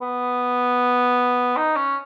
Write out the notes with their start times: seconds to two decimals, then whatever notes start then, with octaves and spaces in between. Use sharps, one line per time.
0.02 B3
1.57 D#4
1.76 C#4